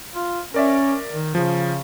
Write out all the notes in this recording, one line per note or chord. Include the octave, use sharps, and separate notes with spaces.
F4
C#4 A#4 D5 E5
D#3
C#3 F3